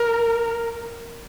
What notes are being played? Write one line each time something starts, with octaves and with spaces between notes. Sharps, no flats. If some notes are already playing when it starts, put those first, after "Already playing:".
Already playing: A#4